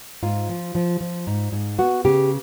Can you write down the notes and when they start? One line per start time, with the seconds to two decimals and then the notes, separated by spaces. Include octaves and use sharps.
0.23 G#2 F4
0.49 F3
0.75 F3
1.01 F3
1.27 G#2
1.52 G#2
1.78 B3 F#4
2.05 C#3 G4